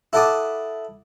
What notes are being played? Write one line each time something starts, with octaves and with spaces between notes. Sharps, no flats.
E4 A4 F#5 A5 D6 D#6